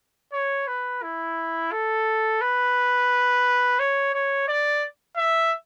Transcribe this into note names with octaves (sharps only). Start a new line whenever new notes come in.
C#5
B4
E4
A4
B4
C#5
C#5
D5
E5